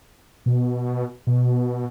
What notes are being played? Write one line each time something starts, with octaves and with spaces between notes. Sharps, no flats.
B2
B2